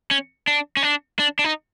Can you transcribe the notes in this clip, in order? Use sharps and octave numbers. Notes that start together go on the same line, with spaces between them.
C#4
D4
C#4
D4
D4
D4
D#4